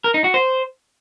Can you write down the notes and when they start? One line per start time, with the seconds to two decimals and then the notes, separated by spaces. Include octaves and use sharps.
0.04 A#4
0.14 D#4
0.24 F#4
0.34 C5